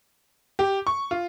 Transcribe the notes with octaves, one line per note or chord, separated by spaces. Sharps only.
G4
C#6
F4